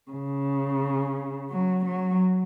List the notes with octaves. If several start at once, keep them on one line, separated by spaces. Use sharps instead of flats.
C#3
F#3
F#3